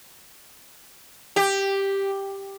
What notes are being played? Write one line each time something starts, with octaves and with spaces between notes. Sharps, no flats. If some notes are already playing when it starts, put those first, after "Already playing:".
G4